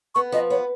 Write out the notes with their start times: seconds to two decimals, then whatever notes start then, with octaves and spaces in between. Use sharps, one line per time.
0.15 B3 C#6
0.32 F3 D#5
0.50 B3 C#5